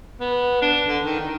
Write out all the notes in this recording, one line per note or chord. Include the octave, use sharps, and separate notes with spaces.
B3
D4
D3
D#3
D#3